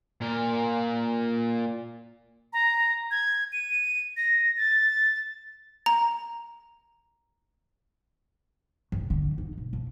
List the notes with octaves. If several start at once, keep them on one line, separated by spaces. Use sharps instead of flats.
A#2 A#4
A#5
G#6
D#7
A#6
A6
A#5
F1
D3
D#4
B1
F2